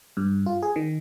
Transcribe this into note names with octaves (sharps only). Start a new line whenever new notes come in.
G2
F4
G#4
D#3